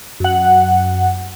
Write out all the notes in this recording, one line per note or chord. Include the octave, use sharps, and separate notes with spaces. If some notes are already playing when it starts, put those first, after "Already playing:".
F#2 F#5